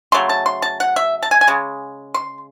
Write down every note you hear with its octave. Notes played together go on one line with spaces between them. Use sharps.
C#3 F#3 A3 C6
A5
C6
A5
F#5
E5
A5
G#5
G#5
C#3 G#3
C6